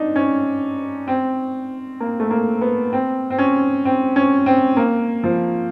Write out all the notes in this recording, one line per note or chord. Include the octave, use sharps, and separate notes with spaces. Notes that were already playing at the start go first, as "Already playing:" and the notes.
Already playing: C4 D4 D#4
C#4
C4
A#3
A3
A#3
B3
C4
C4
C#4
C4
C#4
C4
A#3
F3